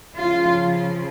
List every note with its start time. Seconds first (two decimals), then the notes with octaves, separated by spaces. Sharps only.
0.15 C#3 F3 F4